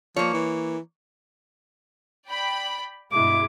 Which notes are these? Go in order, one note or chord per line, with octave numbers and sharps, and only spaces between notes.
F3 A#3 C#5
E3
D5 G5 B5
G2 B2 G#3 E4 D6